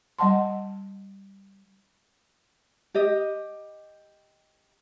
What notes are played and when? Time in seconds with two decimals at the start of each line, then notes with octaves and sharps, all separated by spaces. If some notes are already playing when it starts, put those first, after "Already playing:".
0.19 G3 D#5 F#5 A5 C6
2.94 G4 D#5